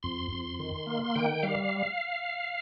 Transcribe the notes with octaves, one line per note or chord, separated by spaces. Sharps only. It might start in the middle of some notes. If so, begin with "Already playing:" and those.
F2 C6
F2
D#3
A#3
D#3 G5
G3 F5